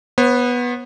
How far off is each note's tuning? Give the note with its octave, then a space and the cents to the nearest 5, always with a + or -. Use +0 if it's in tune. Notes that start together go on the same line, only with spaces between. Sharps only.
B3 -10 C5 +45